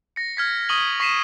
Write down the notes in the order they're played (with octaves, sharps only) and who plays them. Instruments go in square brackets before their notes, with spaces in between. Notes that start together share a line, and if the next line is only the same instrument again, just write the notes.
[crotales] A#6 C#7
F6 G#6 B6
C#6 D#6 D#7 F#7 G7
C#6 B6 C7 D#7 E7